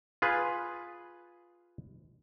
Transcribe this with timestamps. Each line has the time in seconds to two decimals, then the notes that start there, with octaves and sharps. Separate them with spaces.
0.22 F4 G#4 B4